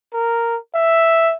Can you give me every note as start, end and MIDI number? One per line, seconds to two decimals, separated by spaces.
0.14 0.57 70
0.75 1.35 76